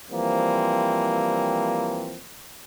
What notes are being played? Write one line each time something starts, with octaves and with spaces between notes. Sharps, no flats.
E3 F3 G3 A#3 C4